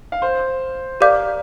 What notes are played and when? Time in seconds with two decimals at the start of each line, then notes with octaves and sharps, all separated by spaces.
0.12 F5
0.22 C5
1.01 G4 A#4 D5 F5 D6 G6